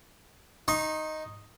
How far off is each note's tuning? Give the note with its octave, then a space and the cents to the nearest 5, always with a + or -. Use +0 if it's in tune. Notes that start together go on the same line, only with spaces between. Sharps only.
D#4 +0 C#6 -45